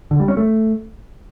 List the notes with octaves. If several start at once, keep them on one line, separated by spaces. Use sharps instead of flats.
D3
G3
C#4
A3